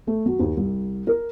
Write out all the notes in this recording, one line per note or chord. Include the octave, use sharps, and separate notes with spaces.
A3
F#3
D#2
C2
A#4